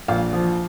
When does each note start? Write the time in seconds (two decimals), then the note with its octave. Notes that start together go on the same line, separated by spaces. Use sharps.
0.08 A#1 F5
0.33 F3